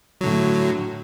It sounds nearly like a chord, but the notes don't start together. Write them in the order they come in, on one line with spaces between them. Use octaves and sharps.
F#3 D3 A2